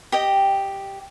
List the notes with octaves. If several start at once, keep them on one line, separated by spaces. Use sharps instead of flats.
G4 D#5 G5